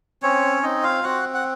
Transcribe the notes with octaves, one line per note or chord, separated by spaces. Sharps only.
C4 C#4 C#5
C4 D#4 D#5
F4 F5
C4 F#4 F#5
F#5